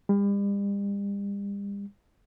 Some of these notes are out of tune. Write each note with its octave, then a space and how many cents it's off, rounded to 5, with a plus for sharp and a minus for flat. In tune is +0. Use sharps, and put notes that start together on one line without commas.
G3 +40